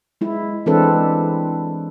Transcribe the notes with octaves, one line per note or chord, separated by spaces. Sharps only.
G#3 E4
E3 G#3 C4 D4 A4 B4